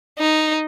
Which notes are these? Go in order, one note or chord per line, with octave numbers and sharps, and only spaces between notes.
D#4